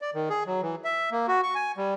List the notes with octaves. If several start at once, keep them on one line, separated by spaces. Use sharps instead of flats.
D5
D#3
G#4
F#3
E3
E5
A#3
F#4
C#6
G#5
G3